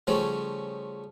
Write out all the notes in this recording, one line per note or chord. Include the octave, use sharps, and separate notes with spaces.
C#3 F3 G3 A3 C#4